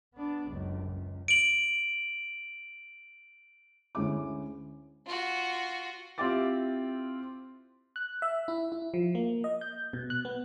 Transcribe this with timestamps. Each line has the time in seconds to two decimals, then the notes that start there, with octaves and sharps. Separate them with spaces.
0.15 B3 D4
0.47 F#1 C#2
0.85 C#2
1.28 D7 F#7
3.95 D2 G#3 C#4 E4 D6
5.06 F4 F#4
6.18 C4 E4 F4 G4 D6 A6
7.96 F#6
8.22 E5
8.48 E4
8.72 E4
8.94 F3
9.15 A#3
9.44 D#5
9.61 G6
9.93 B2
10.10 F#6
10.25 B3